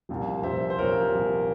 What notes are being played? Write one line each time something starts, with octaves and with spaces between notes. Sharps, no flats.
C2 A#2 F3
C2 A#2 F3 C5 E5
C5
C2 A#2 F3 A#4 C#5
C2 A#2 F3